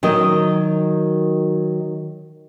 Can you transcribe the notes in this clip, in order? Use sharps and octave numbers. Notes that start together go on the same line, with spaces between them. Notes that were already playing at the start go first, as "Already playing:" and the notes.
D#3 F#3 A#4 D#5